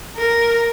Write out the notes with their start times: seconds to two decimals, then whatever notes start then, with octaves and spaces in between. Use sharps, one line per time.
0.17 A#4